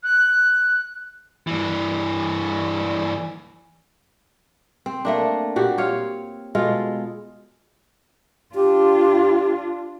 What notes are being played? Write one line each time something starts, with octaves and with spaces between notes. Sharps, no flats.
F#6
G2 E3
C4
A3 A#3 D4
A#2 F#4 G4
C4 C#5 F5
B2 G#3 F4 A4
D4 F4 G4